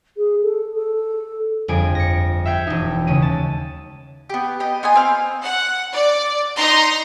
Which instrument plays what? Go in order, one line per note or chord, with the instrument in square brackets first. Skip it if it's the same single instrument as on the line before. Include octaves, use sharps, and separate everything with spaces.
[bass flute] G#4
A4
A4
[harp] G1 F2 G#4 G#5 D7
A#6 C#7
E5 F5 G5 G6 G#6
E1 D#4
D#2 C#3 G#3 C#4 D#7
A5
[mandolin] B3 G4
G4 D#5
B3 F4 D#5 G#5
C4 F5
[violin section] F#5
D5
D#4 A#5 C6